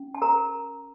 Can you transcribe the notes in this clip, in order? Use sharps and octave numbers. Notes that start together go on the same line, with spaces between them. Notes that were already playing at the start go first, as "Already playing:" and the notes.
Already playing: C#4
A5
A#4 A#5